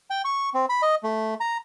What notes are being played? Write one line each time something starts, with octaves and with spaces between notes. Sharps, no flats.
G5
C#6
C4
B5
D#5
A3
A#5